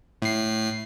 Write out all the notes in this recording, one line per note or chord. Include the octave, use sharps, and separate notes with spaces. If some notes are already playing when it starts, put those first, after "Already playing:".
A2 C7